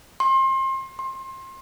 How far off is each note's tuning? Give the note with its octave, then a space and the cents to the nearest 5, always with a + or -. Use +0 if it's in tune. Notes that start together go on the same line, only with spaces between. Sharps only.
C6 +30
C6 +25